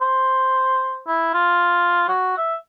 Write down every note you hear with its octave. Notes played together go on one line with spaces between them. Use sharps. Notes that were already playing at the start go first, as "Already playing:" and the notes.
C5
E4
F4
F#4
E5